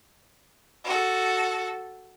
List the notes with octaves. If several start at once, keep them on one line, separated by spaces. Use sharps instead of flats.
F#4 A4